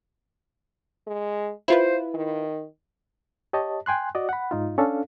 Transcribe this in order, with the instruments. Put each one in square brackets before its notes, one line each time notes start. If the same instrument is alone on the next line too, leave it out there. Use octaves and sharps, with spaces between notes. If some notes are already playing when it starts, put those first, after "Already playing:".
[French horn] G#3
[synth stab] E4 F4 B4 [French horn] C5
[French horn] D#3
[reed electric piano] G4 C#5 D#5 A5
G5 G#5 C6 F#6
F#4 D5 D#5
F#5 B5
G#2 D#4 F4
C#4 D4 A4 F5